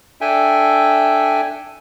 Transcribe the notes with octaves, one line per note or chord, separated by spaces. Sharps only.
D4 A4 E5 G5 G#5